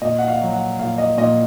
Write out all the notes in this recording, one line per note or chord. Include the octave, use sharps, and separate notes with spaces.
A#2 D#5
F#5
F5
F#3
F#5
A#2 F5
D#5
A#2 D#5